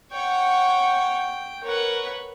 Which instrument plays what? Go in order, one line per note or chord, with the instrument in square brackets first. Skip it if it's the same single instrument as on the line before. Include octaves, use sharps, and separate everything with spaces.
[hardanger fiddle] C#5 F#5 [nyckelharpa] G5
[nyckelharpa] A#4 F#5 [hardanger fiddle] B4 C#5